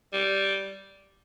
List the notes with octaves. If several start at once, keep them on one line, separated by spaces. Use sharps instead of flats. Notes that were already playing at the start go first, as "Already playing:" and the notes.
G3